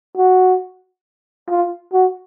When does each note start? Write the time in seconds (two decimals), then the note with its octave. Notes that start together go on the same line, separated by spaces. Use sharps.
0.17 F#4
1.49 F4
1.93 F#4